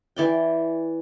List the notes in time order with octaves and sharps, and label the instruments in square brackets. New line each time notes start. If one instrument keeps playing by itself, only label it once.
[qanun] E3 D5 G5